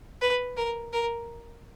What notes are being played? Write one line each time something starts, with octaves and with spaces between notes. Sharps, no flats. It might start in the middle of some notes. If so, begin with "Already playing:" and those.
B4
A#4
A#4